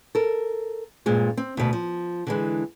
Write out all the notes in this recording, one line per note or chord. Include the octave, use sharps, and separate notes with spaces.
A4 A#4
G2 A#2 G#3 C4
C4
D2 B2
F3
D3 E3 G#3